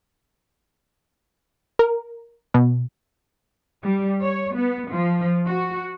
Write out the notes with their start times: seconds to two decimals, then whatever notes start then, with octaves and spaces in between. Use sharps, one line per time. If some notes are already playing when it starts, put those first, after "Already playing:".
1.79 A#4
2.54 B2
3.83 G3
4.23 C#5
4.56 B3
4.91 F3
5.47 F#4